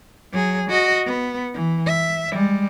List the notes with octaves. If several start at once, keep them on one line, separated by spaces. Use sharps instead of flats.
F#3 G#4
F#4 D#5
B3
E3
E5
G3 G#3